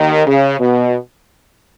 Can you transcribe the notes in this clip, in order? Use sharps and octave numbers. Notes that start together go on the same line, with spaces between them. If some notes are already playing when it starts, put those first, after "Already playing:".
Already playing: D#2 D#3
C#3
B2